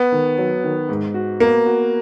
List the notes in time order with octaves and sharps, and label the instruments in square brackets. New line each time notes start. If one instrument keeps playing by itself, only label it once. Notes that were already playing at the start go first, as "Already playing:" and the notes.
Already playing: [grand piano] B3
[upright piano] D#3
F#3
D#3
G#2
F#4
[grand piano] A#3 [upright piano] B3
[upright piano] F#4